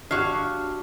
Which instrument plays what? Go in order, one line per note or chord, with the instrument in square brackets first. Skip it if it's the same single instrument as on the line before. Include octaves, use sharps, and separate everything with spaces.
[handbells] D4 G4 [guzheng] F#4 F5